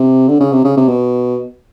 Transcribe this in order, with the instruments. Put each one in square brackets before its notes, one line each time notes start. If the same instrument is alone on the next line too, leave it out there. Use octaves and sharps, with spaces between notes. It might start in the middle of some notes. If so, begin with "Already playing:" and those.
Already playing: [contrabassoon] C3
D3
C#3
C3
C#3
C3
B2